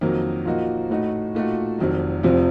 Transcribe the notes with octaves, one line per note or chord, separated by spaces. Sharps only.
F2 D#3 F#3 A#3
A#2 F3 A#3 D#4 F#4
A2 A3 D#4 F#4
A#2 A3 D#4 F#4
F1 F2 D#3 F#3
F1 F2 C3 F3